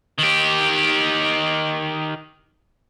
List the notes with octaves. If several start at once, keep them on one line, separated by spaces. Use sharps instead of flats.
D#3 G4